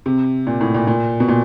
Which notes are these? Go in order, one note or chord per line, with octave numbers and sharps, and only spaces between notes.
C3
A#2
A2
A#2
A#2
B2
A#2